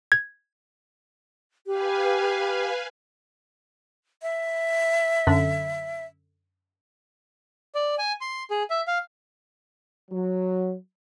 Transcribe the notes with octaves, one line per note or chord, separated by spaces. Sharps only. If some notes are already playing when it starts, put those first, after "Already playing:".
G#6
G4 B4 F5 G#5
E5
F#2 D3
D5
G#5
C6
G#4
E5
F5
F#3